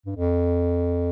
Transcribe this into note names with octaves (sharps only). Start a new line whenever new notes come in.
G2
F2